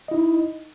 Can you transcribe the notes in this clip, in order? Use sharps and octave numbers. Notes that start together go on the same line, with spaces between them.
D#4 E4 D#5